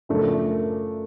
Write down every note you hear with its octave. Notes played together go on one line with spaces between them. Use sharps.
F#2 C#3 F3 A3 D4